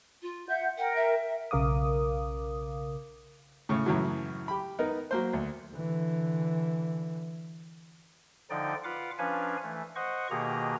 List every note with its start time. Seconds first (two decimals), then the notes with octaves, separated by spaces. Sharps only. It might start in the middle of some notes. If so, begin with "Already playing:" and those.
0.22 F4
0.49 E5 F#5 G6
0.78 A#4 F#5 G5
0.95 E5
1.51 B1 C#3 A#4 F5 D6 D#6
3.69 A2 C#3
3.86 F#2 A2 C#3 E3 F#3
4.48 G4 B5
4.79 B3 D#4 A#4
5.11 F#3 A#3 C5
5.33 D2
5.74 D3 E3
8.50 D3 F3 D#4 D5 G5
8.84 F4 B4 F5 F#5 D6
9.18 F3 C#4 D4 B4 F5 G#5
9.63 E3 A3
9.96 C5 D#5 F#5 C#6
10.31 B2 D#3 A#3 G4 G#4 A#5